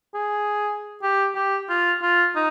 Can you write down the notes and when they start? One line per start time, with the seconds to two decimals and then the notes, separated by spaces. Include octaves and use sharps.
0.14 G#4
1.03 G4
1.35 G4
1.69 F4
2.02 F4
2.35 D#4